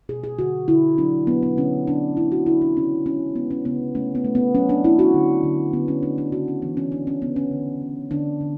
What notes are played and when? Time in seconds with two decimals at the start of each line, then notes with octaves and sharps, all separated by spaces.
0.09 B2 G#4
0.24 G#4
0.39 D3 F#4
0.68 D3 E4
0.98 F#3 D4
1.27 F#3 B3
1.43 B3
1.57 D3 C#4
1.87 D3 D4
2.17 D3 E4
2.32 F#4
2.46 D3 E4
2.61 D4
2.76 C#3 C#4
3.06 G#3 C#4
3.36 G#3 B3
3.51 C#4
3.65 C#3 B3
3.95 A3 C#4
4.15 B3
4.25 A3
4.35 B3
4.54 F#3 C#4
4.69 D4
4.84 A3 E4
4.99 F#4
5.14 D3
5.43 D3
5.73 D3 B3
5.88 C#4
6.03 A3 D4
6.18 D4
6.32 C#3 F#4
6.48 C#4
6.62 E3 B3
6.77 C#4
6.92 E3 D4
7.07 C#4
7.22 C#3 B3
7.36 C#4
7.51 D3
7.81 D3
8.11 D3 D4
8.41 D3